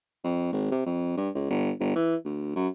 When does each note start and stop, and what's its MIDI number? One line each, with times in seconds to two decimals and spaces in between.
0.24 0.48 41
0.52 0.66 32
0.72 0.84 48
0.86 1.17 41
1.17 1.29 43
1.35 1.49 37
1.50 1.71 31
1.80 1.91 31
1.96 2.16 52
2.25 2.54 38
2.56 2.68 42